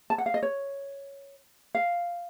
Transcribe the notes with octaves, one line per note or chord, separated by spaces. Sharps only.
A5
F#5
F5
D#5
C#5
F5